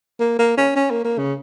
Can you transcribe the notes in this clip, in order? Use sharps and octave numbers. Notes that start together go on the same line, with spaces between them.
A#3
A#3
C#4
C#4
A#3
A#3
C#3